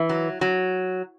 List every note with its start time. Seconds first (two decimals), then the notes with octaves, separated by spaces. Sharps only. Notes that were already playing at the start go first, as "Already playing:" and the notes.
Already playing: E3
0.09 F#3
0.41 F#3